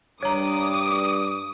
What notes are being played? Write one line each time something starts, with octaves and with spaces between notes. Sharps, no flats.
G2 C#5 A#5 D6 D#6